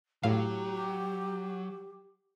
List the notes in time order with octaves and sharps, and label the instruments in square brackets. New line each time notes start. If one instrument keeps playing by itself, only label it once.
[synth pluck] A2 F5 [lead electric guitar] F#3 [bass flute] G4